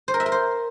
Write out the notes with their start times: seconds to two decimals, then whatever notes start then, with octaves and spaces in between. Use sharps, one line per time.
0.08 C5
0.14 A#4
0.20 E5
0.26 A#4
0.32 C5